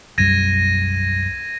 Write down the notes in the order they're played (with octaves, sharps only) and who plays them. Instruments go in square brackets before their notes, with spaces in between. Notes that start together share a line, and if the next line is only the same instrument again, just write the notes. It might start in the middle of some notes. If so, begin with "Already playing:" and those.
[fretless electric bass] B1 F#2 G3 [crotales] G#6 A#6 D#7